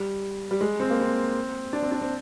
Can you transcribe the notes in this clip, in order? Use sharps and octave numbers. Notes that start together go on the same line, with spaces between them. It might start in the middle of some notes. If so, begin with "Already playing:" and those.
Already playing: G3
G3
G#3
C4
A#3
C4
D4
C4
D4
C4